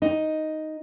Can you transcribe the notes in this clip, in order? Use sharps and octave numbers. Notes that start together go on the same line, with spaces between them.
D#4